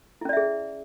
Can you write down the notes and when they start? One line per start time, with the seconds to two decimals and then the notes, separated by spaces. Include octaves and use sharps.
0.21 E4
0.25 C#4
0.29 D5
0.33 E5
0.37 G#4